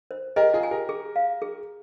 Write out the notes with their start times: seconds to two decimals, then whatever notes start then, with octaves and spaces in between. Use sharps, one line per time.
0.11 C5
0.36 G4 A#4 D#5
0.53 F4 G#4
0.63 G#5
0.71 G4 A#4
0.89 G#4
1.16 F5
1.42 G#4